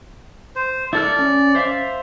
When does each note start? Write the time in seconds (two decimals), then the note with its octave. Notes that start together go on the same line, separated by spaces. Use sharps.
0.56 C5
0.93 E4 A4 D5 F6
1.19 C#4
1.55 C5 E5 F5